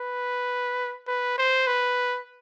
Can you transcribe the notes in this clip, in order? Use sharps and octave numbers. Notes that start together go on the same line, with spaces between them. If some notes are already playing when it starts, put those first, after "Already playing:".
Already playing: B4
B4
C5
B4